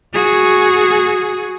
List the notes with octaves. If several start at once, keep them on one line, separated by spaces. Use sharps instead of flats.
F#4 G#4